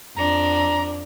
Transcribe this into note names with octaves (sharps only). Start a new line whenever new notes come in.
F2 D4 A#5